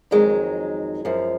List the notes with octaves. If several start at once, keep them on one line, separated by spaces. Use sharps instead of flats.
F2 D#3 F#3 G#3
F#2 F3